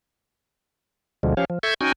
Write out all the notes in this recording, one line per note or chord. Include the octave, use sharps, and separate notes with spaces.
D2 B2 D3 F3 G#3
F3 C#4 G4 C#5 F5
F3
A4 E5 C#6 G6 G#6
C#4 D#4 F#4 G5 G#5